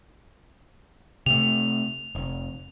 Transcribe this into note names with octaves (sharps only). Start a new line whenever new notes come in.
C3 A3 F7
F1